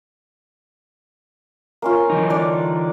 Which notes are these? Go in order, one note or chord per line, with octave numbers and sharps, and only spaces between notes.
A#3 C#4 F4
D3 E3 D#4
D4 D5